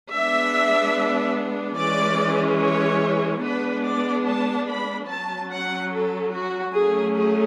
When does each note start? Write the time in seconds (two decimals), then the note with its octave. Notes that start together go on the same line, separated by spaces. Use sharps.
0.14 G#3 B3 D4 E5
1.79 E3 G#3 C#4 D5
2.61 C#5
3.44 G#3 B3 D4 B4
3.86 D5
4.27 A5
4.68 B5
5.09 F#3 C#4 A5
5.51 F#5
5.92 A4
6.33 F#4
6.74 F#3 A3 C#4 G#4
7.16 G#4